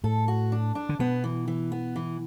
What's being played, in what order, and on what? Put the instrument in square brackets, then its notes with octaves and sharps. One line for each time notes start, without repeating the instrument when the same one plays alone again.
[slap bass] A2 [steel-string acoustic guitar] A4
[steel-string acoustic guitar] F#4
D4
D4
[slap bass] D3
[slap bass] B2 [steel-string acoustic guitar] B3
[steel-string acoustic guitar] E3
E3
B3
E3